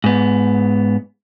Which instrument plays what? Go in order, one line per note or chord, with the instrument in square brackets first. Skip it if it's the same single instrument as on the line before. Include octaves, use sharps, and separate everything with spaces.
[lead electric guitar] G#2 B3